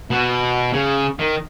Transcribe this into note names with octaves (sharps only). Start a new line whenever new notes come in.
B2
C#3
D#3